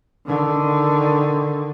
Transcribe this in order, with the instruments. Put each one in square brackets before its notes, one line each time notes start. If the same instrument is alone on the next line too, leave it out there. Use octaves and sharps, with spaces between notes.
[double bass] D3 D#3